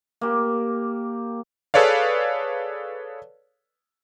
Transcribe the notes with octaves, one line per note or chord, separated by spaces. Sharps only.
A#3 G4
G#4 A4 B4 C#5 D5 F5